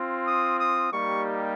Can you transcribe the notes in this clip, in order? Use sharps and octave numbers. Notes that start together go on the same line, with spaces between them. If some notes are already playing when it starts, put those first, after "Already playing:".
Already playing: C4 F4
D#6
D#6
G3 A#3 D#4 G4 C#6